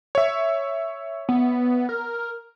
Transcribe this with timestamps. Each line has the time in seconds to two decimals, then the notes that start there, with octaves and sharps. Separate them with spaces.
0.15 C#5 E5
1.29 B3
1.89 A#4